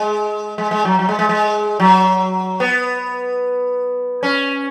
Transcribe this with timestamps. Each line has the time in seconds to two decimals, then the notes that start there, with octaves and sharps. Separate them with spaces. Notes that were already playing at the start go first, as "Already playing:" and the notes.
Already playing: G#3
0.58 G#3
0.71 G#3
0.85 F#3
0.99 F#3
1.09 G#3
1.19 G#3
1.29 G#3
1.80 F#3
2.60 B3
4.23 C#4